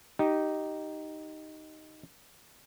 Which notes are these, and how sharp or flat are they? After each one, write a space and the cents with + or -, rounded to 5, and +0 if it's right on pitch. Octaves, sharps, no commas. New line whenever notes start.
D#4 +0 G4 -15